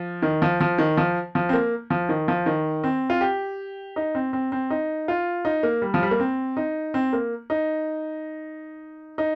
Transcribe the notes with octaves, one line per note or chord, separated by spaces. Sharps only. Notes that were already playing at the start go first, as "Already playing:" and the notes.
Already playing: F3
D#3
F3
F3
D#3
F3
F3
C4
A#3
F3
D#3
F3
D#3
C4
F4
G4
D#4
C4
C4
C4
D#4
F4
D#4
A#3
G3
F3
G3
A#3
C4
D#4
C4
A#3
D#4
D#4